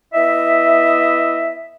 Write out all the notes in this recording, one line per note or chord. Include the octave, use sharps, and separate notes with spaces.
B3 E4 D#5 E5